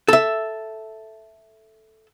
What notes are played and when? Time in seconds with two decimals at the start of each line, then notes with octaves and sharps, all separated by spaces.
0.08 A4 E5